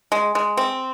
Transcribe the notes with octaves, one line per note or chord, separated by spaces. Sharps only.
G#3
G#3
C4